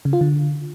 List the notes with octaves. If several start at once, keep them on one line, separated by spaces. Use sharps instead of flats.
C#3
F4
D3